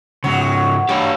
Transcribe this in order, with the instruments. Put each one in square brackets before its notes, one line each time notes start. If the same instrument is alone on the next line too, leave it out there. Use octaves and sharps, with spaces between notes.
[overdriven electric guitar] G#2 C#3 [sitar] F#3
[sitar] G2 [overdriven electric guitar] G4 C#5